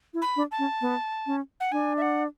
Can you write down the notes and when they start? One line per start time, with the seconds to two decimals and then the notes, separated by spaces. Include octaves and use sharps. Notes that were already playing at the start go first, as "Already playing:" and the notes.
0.14 E4
0.22 B5
0.36 D4
0.51 A5
0.59 C#4
0.81 B3
1.27 C#4
1.60 F#5
1.72 D4 G#5
1.97 E5
2.02 F#5